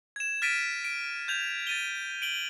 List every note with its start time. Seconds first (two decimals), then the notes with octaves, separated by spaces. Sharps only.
0.16 G#6 E7
0.42 F6 A6 B6 D7 D#7
0.84 D7
1.28 G6 G#6 F7
1.67 A6 D#7 G7
2.22 D7 F#7 G7